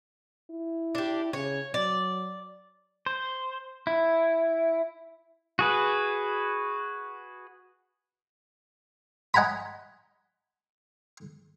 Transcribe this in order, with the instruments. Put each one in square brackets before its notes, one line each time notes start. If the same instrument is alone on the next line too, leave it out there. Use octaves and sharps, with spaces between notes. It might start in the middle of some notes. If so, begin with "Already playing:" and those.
[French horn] E4
[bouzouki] D4 G4
[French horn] C#3 [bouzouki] C#5
[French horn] F#3 [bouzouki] D5
[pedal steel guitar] C5
E4
F#4 G#4 B4
[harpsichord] D#5 F#5 G#5 A#5 B5